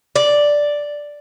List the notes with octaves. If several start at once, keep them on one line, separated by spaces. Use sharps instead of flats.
D5